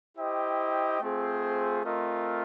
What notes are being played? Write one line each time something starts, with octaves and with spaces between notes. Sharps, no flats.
E4 G4 C5 D#5 G5
A3 C4 F4 G#4 C5
A3 C4 F4 A#4 D#5